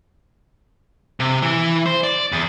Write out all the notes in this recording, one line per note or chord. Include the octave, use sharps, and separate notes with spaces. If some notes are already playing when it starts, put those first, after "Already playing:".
C3
E3
C5
D5
E2